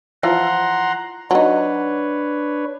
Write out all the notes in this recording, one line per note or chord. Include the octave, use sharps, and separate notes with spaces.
E3 F3 F5 F#5 A#5 C6
F#3 D4 D#4 B4 C#5